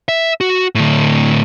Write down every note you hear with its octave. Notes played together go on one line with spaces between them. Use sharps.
E5
F#4
A2 D3